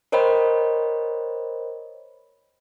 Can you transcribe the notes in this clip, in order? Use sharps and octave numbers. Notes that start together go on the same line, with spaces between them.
A#4 C5 C#5 D#5 G5 B5